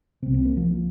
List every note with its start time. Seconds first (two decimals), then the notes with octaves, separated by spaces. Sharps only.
0.22 C3 C4
0.26 C2
0.34 C4
0.45 A#3
0.57 F3